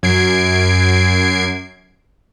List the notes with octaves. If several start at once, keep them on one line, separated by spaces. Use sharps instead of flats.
F#2 G#6 C7 D7